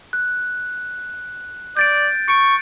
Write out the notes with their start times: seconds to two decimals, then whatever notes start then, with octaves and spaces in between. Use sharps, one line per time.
0.13 F#6
1.77 D5 G6 A6 D7
2.28 C#6 C#7 D7